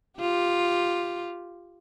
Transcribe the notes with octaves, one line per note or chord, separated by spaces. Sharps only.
F4 G4